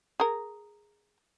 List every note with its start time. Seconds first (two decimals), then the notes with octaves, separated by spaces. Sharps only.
0.20 G#4 A#4